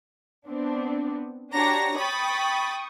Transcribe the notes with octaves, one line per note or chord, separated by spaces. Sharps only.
B3 C4 D4
D4 F#4 G4 C#5 A#5 A#6
G5 B5 C#6 D#6 A6